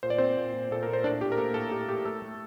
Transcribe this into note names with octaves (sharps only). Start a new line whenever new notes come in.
A#2 C5
D5
C4 C5
A#2
A#2
A#2 A4
A#2 A#4
C5
A2 D4 D5
A2 G4
A#4
A#3 A4
A2 A4
A2 G4
A2 G4
A3 A4
A3